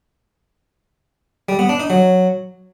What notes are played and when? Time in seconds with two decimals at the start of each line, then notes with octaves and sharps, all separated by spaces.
1.49 G3
1.59 B3
1.69 D4
1.80 D#4
1.90 F#3